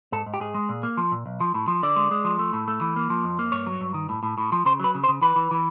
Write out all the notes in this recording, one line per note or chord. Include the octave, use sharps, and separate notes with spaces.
G#2 A4
G#2
G4
G#2 G#4
G#3
A#2
A#3
F3
A#2
B1
F3
A2
F3
D3 D5
G#3
G#3
F3
A3
A2
A3
E3
A#3
F3
F2
A#3
G2 C#5
F#3
G2
D#3
A2
A2
A2
F3
C#3 C5
F#3 B4
C#3
C5
C#3
E3 B4
E3
E3